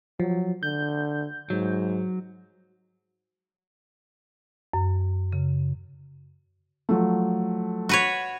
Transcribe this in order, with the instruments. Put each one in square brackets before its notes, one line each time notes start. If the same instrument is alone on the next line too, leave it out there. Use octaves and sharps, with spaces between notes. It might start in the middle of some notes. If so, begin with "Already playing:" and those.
[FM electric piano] F3 [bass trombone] F#3
[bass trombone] D3 [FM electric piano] G6
[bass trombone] G#2 [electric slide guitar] F#3
[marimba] F#2
C#3
[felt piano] F3 F#3 A3
[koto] F#4 B4 C#5